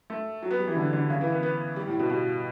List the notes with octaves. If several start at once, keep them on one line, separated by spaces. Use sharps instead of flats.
A3
F#3
B3
G3
E3
D3
D3
C#3
E3
B3
B3
G3
A2
B2
B2